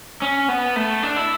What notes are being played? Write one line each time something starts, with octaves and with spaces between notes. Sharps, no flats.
C#4
B3
A3
D4
E4